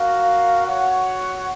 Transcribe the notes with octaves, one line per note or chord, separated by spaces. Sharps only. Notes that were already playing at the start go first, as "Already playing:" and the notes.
Already playing: F#4 A#4 F5
F#4 C#5 F#5